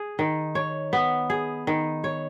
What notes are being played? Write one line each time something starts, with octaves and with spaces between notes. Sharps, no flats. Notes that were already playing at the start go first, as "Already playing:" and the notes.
Already playing: G#4
D#3
C#5
B3
G#4
D#3
C#5